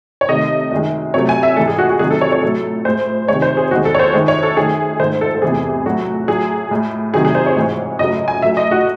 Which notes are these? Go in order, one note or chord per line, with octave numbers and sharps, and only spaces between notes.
C#5
C3 D#3 A3 D#5
F#2 D#3 G#3
C3 F#3 A3 C#5
G#5
E5
G#2 E3 G#3 A4
G#4
F#4
F#4
C3 D#3 F#3 A3 G#4
A4
C#5
C#5
A2 F#3 A3 A4
A2 G#3 C5
C3 D#3 G#3 C#5
C5
G#4
E2 D#3 G#3 F#4
A4
C#5
C5
F#2 D#3 G#3
C#5
A4
F#2 D#3 A3 G#4
G#2 D#3 A3 C5
A4
A4
E2 C3 E3 A3 G#4
A2 F#3 A3 F#4
A2 F#3 A3 G#4
A2 G#3
C3 D#3 F#3 A3 G#4
G#4
C5
C#5
G#2 E3 G#3
F#2 C#3 F#3 A3 D#5
G#5
A2 F#3 A3 E5
D#5
F#4